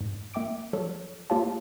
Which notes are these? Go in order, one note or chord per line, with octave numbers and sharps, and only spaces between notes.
G#2
A#3 E5 G5 D6 D7
F3 F#3 A4 C#5
A#3 F4 G4 C#5 F5 A5